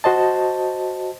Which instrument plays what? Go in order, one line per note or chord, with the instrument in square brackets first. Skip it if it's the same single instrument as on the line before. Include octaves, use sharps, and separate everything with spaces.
[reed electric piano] F#4 C5 D#5 A5